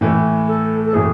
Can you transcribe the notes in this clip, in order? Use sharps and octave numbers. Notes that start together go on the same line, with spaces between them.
A2 E3 A3
A4
A4
A2 E3 A3 G#4